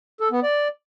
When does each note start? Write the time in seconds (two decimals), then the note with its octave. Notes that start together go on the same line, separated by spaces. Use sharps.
0.20 A4
0.32 B3
0.43 D5